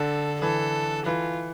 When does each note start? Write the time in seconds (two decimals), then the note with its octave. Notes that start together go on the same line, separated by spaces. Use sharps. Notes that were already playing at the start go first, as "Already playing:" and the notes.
Already playing: D3 A4
0.41 E3 A4
1.06 E3 F4